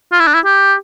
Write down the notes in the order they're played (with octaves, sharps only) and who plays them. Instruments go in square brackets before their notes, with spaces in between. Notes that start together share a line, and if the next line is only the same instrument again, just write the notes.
[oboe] F4
E4
D4
E4
G4